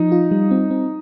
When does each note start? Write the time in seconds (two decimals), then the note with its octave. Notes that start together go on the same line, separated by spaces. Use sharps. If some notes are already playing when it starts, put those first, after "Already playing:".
Already playing: F3 D#4
0.12 F4
0.31 G3
0.51 C4
0.71 C4